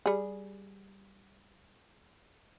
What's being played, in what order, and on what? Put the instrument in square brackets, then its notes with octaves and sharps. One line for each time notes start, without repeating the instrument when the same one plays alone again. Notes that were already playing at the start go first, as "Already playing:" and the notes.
[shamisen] G3 G#4